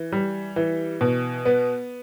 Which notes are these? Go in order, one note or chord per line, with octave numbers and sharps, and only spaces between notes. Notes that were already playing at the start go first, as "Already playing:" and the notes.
Already playing: E3
G3
E3
B2
B3